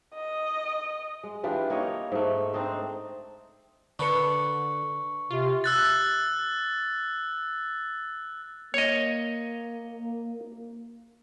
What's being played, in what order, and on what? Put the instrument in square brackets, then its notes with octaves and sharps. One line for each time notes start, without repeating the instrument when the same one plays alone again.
[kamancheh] D#5
[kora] G#3
E3 D4 F4 G4
A#3 D#4 C#5 D#5
G#2 A3
C4 D4 D#4 C5
[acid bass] D3 [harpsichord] D4 B4 [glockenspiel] C#6 C#7
[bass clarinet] C3 [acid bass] F4
[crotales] E6 F#6 A6
[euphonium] A#3 [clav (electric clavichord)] C#5 D#5